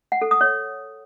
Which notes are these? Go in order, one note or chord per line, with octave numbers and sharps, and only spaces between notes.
F#5
A4
D#6
C#5